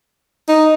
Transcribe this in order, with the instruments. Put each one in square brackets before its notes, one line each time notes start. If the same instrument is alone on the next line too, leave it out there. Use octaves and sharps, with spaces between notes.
[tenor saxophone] D#4